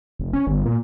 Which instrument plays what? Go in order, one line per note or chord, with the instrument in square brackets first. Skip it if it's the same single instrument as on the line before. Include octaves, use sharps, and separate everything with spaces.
[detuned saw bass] F1
C#4
G1
A#2